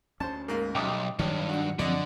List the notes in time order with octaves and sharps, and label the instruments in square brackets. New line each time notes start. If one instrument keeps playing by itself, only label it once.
[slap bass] D2 C#4 [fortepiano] C5 A5
[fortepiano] G#2 A#3 [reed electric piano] A#4
[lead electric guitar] B1 [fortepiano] G2 A3 [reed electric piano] G5 D6 D#6
[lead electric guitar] G2 [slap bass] D#3 F#3 G3 [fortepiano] C#4
[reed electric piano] D4 [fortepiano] F#4 F#5
[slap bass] F#2 [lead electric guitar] D3 [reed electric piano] F3 C4 [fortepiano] D5 D#5 F#5